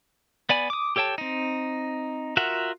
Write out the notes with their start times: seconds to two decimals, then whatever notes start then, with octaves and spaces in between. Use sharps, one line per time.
0.49 B3 D5 G#5 B5
0.70 D6 D#6
0.96 G4 A4 C#5 G5 A5
1.18 C4 D#4
2.37 F4 F#4 A#4 E5 F#5